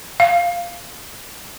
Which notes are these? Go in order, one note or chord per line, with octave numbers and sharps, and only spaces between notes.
F5